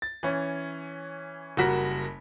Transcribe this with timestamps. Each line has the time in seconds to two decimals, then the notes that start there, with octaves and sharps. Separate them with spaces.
0.02 A6
0.23 E3 C#4
1.57 F#1 G3 F#4 A#4 B6